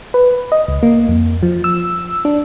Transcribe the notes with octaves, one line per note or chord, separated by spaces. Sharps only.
B4
D#5
C#2
A#3
F2
F3
E6
D4